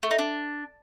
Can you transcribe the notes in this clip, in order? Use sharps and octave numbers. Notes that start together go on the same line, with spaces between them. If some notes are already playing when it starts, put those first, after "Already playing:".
A3
D#4
D4